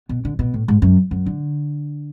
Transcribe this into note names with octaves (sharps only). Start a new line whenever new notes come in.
B2
D3
B2
A2
G#2
F#2
F#2
D3